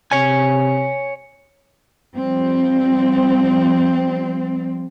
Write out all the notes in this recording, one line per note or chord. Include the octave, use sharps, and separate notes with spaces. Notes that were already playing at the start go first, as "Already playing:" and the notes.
C3 C#5 G#5
F3 G3 C4